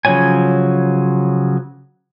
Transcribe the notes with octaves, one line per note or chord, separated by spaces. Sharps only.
C#3 F3 F#3 C#5 G#5